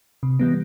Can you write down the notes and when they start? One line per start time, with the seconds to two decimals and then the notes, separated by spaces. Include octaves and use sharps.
0.23 C3
0.39 E3 G3 B3